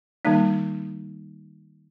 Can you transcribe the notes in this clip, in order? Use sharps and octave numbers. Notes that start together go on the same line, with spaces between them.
D#3 G3 A#3 D#4